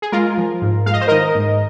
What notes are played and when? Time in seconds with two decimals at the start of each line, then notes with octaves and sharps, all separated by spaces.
0.02 G#4
0.12 G#3 F4 A#4
0.38 F3
0.62 G#2
0.86 G#3 F5
0.94 D#5
1.01 C5
1.08 D#3 A#4 D#5
1.35 G#2